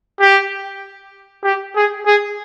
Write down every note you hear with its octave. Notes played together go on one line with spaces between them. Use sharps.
G4
G4
G#4
G#4